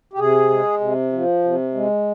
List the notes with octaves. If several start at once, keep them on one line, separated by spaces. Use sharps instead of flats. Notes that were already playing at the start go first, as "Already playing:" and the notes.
G4
C3 G#4
G#3
C3
F3
C3
G#3